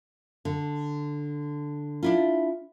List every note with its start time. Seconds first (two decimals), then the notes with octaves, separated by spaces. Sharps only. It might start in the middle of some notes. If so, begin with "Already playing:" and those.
0.45 D3
2.03 D4 E4 F4